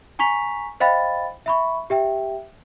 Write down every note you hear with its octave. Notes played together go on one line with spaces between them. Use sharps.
G#5 A#5 C#6 B6 F7
C5 D#5 F5 G5 B5 A6
E5 B5 C#6
G4 E5 G5